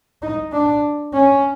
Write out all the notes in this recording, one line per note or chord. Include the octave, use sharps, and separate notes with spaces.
D#4
D4
C#4